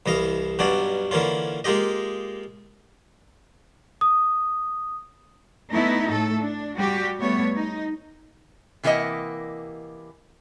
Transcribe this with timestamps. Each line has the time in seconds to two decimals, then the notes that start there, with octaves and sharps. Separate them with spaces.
0.06 C2 E3 D#5 F5
0.59 G2 B2 F#3 C#4 D4 D5
1.11 D3 E3 A#3 C#4 F4
1.64 G#3 A#3 F4 G4 D#5
4.01 D#6
5.71 A3 B3 D#4 E4
6.10 A2 A3 A4
6.41 D4
6.76 G3 F#4 G4
7.19 G3 A3 B3 C#5
7.56 D#4
8.83 C3 E3 A#3 F4 D#5 F#5